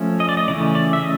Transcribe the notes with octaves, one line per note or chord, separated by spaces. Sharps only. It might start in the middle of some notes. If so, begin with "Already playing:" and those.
Already playing: F3 A3 C#4
D#5
D5
D#5
C#3 E3 A3 C#4 D5
D5
E5
D#5